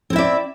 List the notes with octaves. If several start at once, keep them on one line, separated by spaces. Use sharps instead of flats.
C4 E4 D5 E5